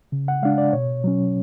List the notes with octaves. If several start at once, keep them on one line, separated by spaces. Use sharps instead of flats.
C#3
F#5
G#3 D4 F5
D5
B2 C#5
F#3 C#4